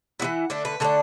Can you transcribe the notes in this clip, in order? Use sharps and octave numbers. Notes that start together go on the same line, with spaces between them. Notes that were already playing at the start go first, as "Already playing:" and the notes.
E3 B3 E4 F#5
D3 A3 D4
B4
D3 A3 D4 A4